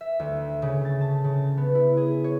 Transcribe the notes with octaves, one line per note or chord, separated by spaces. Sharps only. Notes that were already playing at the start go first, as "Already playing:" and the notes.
E5
D2
C#3
A6
A5
C#3
B3
E4
G#4
C#5